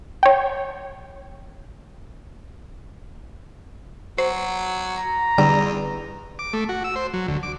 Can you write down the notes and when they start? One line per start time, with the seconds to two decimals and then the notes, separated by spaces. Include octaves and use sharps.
0.23 C#5 G5
4.18 F#3 C5
4.98 A#5
5.38 E2 D3 G3 D6
6.39 D6
6.53 A3
6.69 F#4
6.84 E6
6.96 C5
7.14 F#3
7.28 D2
7.43 D6